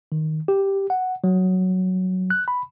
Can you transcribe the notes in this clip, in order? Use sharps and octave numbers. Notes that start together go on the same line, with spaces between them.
D#3
G4
F#5
F#3
F#6
B5